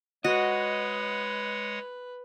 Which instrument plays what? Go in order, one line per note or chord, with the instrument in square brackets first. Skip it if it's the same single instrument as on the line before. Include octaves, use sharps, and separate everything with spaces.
[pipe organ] G#3 C#5 F#5 [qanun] F#4 [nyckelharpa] B4 [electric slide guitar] D#5